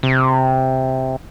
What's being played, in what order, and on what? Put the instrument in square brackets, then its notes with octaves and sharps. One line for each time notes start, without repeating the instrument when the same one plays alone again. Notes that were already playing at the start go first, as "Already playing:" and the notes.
[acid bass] C3